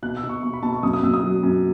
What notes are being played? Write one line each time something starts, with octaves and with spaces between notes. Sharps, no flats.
B2 F#6
E6
B2
C#6
B2 C#6
B5
B2 A5
C#6
F#2 D#6
D#6
F#2 E6
D#6
F#3
F#2